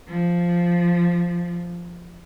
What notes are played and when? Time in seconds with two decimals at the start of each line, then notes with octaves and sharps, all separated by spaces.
0.08 F3